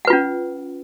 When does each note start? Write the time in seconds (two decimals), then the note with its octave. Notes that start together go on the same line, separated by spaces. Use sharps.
0.05 F#5
0.07 B4
0.10 F4
0.13 C#4